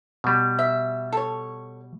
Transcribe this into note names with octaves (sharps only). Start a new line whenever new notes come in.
B2 G3
E5
A4 C#5